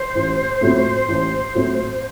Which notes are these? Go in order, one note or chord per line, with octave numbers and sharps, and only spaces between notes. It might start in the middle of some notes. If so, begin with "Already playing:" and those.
Already playing: C5
A1
A2 F#3 C4
A1
A2 F#3 C4